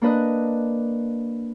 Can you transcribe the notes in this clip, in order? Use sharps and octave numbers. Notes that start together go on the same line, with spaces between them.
A#3 D4 B4 D#5 F#6